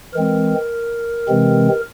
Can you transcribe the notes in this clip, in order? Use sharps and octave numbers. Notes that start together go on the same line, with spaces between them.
E3 G#3 C4 A#4
C3 E3 G#3 C4